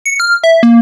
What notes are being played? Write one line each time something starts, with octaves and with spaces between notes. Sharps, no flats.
C#7
F6
E5
A#3